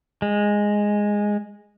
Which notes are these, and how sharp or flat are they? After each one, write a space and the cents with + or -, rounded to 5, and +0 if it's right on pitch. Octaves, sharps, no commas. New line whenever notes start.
G#3 -5